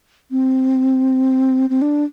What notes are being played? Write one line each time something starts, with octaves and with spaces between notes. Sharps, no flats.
C4
C4
D4